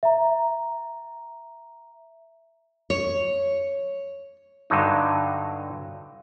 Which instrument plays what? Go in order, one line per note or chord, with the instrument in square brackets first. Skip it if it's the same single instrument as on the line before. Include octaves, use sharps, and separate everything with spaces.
[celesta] E5 A#5
[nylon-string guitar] C#5
[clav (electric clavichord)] G2 D3 F#3 D#4